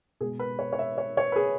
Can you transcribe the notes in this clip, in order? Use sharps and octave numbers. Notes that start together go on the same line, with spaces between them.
B2 G#3 G#4
B4
C#5
C#5
E5
C#5
C#5
B4
G#4